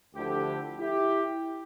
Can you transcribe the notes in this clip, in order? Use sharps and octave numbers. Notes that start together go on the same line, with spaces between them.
D2 D3 F3 E4 G4
E4 G4